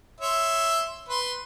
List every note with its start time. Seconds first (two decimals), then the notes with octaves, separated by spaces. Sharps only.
0.21 C#5 E5 C6
1.09 B4 C6